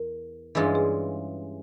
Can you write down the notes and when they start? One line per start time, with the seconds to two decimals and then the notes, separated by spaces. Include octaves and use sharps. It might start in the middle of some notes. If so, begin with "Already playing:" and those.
Already playing: E2 A#4
0.55 G2 E3 G#3 C#4 F4 G#4
0.75 G#4